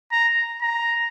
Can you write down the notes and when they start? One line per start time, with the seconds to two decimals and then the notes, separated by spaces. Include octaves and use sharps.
0.12 A#5
0.62 A#5